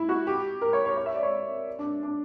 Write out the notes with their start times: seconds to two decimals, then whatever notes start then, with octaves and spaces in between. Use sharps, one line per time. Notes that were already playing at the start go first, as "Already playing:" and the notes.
Already playing: E4
0.09 F#4
0.27 G4
0.61 A#4
0.73 C#5
0.85 C#5
0.97 C#5
1.06 E5
1.15 D5
1.23 C#5
1.79 D4
2.03 D4